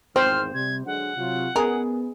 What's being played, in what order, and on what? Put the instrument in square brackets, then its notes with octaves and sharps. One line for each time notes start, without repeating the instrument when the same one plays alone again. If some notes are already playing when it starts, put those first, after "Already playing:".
[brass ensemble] G#1 E2 G#2 [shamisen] C4 [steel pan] C5 [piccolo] F6
[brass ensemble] C3 G3 [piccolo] G#6
[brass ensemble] D3 F#3 G#3 [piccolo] F#5
[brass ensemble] C3 F#3 F4
[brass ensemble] B3 [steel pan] G#4 [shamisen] A#4